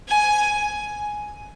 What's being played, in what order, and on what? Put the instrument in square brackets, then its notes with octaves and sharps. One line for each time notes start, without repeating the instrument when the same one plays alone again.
[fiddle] G#5